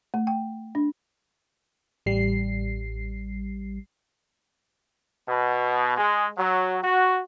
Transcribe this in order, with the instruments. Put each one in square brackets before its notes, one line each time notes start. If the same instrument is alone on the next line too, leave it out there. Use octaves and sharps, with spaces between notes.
[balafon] A3
G5
D4
[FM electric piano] A1 G3 C7
[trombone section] B2
G#3
F#3
F#4